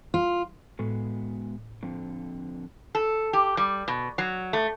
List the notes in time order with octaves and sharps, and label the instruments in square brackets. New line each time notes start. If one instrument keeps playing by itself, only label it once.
[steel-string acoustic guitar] F4
[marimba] A2 [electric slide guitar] G#3 B3 F#4
[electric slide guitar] D3 F3 C4
[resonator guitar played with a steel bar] A4
G4
G3
B2
F#3
A3